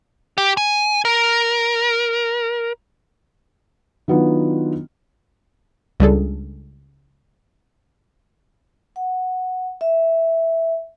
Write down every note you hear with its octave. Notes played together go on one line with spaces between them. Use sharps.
G4
G#5
A#4
D#3 F#3 B3 D4 F4
C#2 G3 D4 G#4 A4
F#5
E5